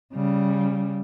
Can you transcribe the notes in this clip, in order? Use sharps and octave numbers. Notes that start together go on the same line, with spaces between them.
C#3 G3